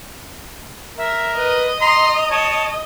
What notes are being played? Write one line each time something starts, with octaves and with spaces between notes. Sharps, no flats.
A#4 E5
B4 D#5
A#5 C6
C#5 A5